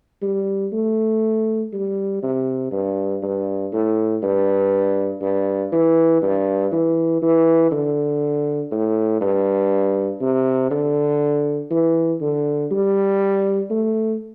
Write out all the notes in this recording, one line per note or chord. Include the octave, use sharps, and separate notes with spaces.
G3
A3
G3
C3
G2
G2
A2
G2
G2
E3
G2
E3
E3
D3
A2
G2
C3
D3
E3
D3
G3
A3